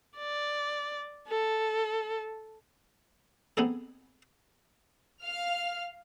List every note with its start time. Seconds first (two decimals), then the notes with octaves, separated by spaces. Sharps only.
0.17 D5
1.28 A4
3.57 B3 C4 D#4 G#4 A4
5.22 F5 F6